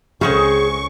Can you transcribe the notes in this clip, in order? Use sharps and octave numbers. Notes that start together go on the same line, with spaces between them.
C#2 C#3 G#3 C4 C#4 G#4 C#6